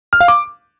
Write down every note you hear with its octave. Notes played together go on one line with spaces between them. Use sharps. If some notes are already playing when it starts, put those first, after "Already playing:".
F6
F5
D6